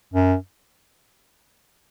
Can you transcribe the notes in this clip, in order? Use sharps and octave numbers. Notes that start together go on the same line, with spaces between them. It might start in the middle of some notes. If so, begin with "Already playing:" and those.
F#2